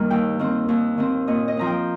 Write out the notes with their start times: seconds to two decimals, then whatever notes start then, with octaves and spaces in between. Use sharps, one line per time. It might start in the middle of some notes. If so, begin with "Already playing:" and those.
Already playing: G2 D#3 G3 A#3
0.10 D#2 G5
0.39 D#3 C4
0.69 D#2
0.98 D#3 C4
1.27 A#2 D#5
1.48 D#5
1.57 F3 C4 A#5
1.67 G5